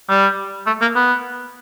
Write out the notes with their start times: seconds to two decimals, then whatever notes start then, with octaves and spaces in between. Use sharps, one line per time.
0.09 G3
0.67 A3
0.81 A#3
0.95 B3